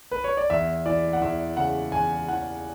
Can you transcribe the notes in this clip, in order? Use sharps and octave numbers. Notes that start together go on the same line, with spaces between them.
B4
C#5
D5
E2 E5
E3 D5
F#5
E2 E5
C#3 F#5
E2 G#5
E3 F#5